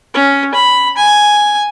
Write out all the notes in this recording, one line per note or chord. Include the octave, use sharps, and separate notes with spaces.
C#4
B5
G#5